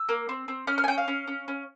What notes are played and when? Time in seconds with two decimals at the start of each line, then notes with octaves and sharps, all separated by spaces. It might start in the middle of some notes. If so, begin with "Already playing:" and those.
Already playing: E6
0.09 A#3
0.29 C4
0.48 C4
0.67 C#4 F6
0.78 F6
0.84 G#5
0.88 C#4 G5
0.98 F5
1.08 C#4
1.28 C#4
1.48 C#4